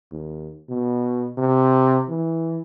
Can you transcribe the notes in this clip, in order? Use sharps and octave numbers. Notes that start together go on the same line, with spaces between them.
D#2
B2
C3
E3